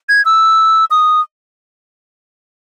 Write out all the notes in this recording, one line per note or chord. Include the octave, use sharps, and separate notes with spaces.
G#6
E6
D#6